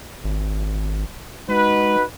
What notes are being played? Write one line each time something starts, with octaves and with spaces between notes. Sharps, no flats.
G#1
G#3 D#4 F#4 B4